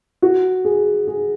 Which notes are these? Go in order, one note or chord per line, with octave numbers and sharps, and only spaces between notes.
F#4
G#4
G#4